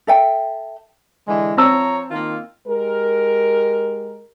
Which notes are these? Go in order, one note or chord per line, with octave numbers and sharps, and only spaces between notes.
A4 E5 G5
D3 E3 G#3
F3 C4 C#5 A5 A#5 E6
D#3 A#3 F4
G#3 G4 A#4